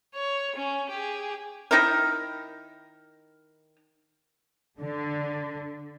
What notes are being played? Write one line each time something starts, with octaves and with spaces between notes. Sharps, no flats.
C#5
C#4
G4 G#4
D#3 D#4 E4 A#4
D3